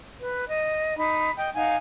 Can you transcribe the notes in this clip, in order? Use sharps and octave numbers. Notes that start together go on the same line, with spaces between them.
B4
D#5
D#4 B5
D#5 G5
D#4 F5 F#5 G#5